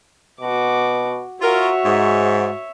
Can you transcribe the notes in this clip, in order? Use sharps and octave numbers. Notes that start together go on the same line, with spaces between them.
B2 F#4 D6
F4 F#4 A#4 C#5 E5
G#2